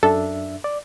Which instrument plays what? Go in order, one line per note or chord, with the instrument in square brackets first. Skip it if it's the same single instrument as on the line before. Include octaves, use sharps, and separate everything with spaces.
[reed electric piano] F#2 D4 E5 [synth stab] A4
[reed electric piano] D5